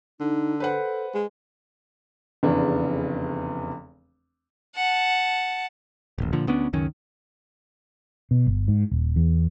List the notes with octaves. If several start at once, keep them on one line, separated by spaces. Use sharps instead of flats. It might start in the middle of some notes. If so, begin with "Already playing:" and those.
D3 D#4
A4 B4 C5 F#5
G#3
F1 E2 C#3 B3 D4
F#5 A5
D#1 A1
A#2 D3 F3
D2 B3 C#4 D4
C#2 F#2 D#3 C#4
B2
G1
G#2
D#1
E2